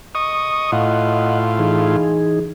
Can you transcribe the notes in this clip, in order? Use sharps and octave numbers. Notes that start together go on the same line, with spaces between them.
D#5 C#6 D#6
A2 F4 D#5 F#5
E3 D#4 G#4